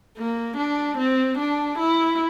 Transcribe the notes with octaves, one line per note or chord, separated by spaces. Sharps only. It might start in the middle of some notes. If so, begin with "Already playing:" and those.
A#3
D4
C4
D4
E4